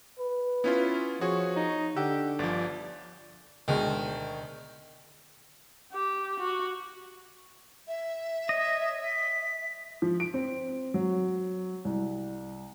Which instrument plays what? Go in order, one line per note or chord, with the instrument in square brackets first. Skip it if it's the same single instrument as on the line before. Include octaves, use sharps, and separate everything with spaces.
[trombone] B4
[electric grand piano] B3 C#4 F4 [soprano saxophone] E4
[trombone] F3 [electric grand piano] F#4 G#4 [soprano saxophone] C#5
[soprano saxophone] D#4
[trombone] D3 [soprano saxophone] G4 [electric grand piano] F#5 E6
[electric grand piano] G1 F3 [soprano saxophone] D5
[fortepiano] D2 B2 G#3 [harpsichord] D#3
[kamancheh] G4
F#4
[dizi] E5
[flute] C#5 [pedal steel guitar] D#5
[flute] B6
[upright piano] F3
D7
C4
F#3
C2